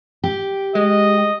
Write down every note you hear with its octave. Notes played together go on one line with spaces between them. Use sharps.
G4
G#3 D#5